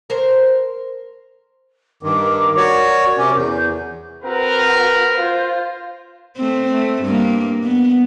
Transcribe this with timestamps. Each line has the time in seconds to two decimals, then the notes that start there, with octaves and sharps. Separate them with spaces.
0.10 A#4 C5
2.03 G2 D#3 A#4 D6
2.57 F#4 A#4 C#5 D5
3.18 C3 C#4 A#4 D6
3.36 E2 G6
4.23 C4 F#4 A#4 B4
5.13 F4 C5
6.37 A3 C4
6.72 A3
7.03 G2 A#3
7.63 B3